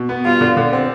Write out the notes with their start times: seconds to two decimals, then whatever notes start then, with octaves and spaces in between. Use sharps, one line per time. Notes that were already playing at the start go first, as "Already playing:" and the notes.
Already playing: B2
0.09 B3
0.25 G3 F4
0.41 D3
0.57 D3
0.73 C4